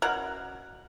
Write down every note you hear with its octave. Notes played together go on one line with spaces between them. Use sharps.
B2 C#4 A#4 F#5